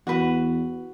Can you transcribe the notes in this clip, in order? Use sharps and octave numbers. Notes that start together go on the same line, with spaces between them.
E2 F#4 B4